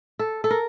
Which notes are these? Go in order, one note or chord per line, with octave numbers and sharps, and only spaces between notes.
A4
A4
A#4